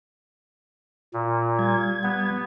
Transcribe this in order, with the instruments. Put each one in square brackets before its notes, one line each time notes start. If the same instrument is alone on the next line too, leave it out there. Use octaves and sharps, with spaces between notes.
[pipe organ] A#2
[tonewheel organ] G3 G#6
[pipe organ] B3